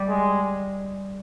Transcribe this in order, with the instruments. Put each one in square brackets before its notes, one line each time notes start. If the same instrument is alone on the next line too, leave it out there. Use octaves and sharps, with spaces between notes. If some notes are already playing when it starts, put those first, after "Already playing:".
Already playing: [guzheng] G3
[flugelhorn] G#3